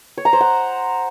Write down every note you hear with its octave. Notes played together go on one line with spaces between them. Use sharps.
C#5
A#5
C5
F#5